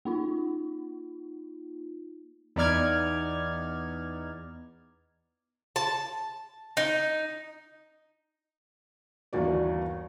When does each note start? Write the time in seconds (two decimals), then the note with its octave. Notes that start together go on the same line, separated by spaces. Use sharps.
0.05 A#3 D#4 F4
2.56 E2 B3 D#4 D5 F6 G#6
5.76 A5
6.77 D#4
9.33 G1 D#2 E3 F#4 D5